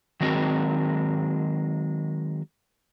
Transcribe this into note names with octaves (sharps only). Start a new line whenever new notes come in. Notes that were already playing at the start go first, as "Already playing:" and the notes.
D#3 F#3 G#3 C4 F#4 A#4